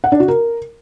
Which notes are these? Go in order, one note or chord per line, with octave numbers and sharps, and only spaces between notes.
F#5
D4
F#4
A#4